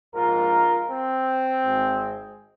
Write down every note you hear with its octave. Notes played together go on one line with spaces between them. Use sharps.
A#1 G#2 G#3 F4 A#4
C4
G#1 G#2 G#3